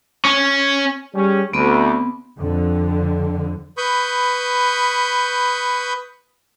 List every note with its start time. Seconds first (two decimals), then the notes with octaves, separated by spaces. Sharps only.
0.25 C#4
1.14 G3 C#4 G#4
1.53 D2 B3 C4 B5
2.37 F2 D3
3.78 B4 B5 C#6 D#6 G6